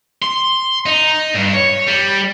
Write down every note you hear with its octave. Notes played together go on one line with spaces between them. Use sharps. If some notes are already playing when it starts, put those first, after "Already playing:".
C6
D#4
G2
C#5
G3